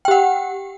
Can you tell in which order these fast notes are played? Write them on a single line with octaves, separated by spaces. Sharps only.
G5 G4 F#5